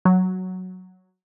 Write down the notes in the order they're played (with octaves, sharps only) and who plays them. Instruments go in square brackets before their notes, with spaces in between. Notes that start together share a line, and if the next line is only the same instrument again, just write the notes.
[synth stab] F#3